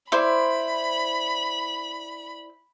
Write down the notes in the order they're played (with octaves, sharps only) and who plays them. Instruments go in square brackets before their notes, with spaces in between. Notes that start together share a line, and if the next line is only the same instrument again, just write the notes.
[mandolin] E4 C5 D5 [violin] B5